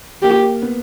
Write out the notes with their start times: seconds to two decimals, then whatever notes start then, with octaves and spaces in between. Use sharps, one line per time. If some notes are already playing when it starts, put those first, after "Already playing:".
0.23 A#3 G4
0.62 B3